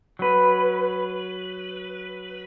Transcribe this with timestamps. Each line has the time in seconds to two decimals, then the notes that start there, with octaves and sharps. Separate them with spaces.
0.19 F#3 B4